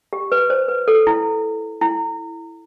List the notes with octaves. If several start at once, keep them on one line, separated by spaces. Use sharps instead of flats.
G4
B4
C5
B4
A4
E4
E4